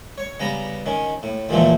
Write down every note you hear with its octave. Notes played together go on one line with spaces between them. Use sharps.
C#5
C#3 G3 B3 A#5
D#3 C#4
A2
D#2 A#2 D3 E3 F3 A3